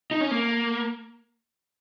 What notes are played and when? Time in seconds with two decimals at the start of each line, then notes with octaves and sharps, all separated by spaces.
0.11 D#4
0.21 C#4
0.31 A#3